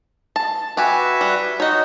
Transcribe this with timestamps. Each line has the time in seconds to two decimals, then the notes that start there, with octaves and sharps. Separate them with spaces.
0.36 A5
0.77 F#4 G4 B4 E5 G#5
1.21 G3
1.60 D#4 F#4 C#5 D#5